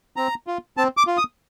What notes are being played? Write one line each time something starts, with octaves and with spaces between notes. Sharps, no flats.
C4 A#5
F4
C4 A5
D6
F4
D#6